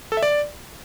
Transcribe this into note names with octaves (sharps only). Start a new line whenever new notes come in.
A4
E5
D5